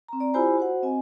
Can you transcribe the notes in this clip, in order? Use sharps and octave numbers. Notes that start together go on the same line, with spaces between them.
C4 A#5
D5 A#5
E4 F4 G4 C5 G#5 B5
F#4 C5 F#5
C4 D#5 G#5